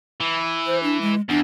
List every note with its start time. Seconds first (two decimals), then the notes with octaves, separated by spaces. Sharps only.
0.21 E3
0.66 C5
0.83 D4
1.01 G#3
1.29 E2 D4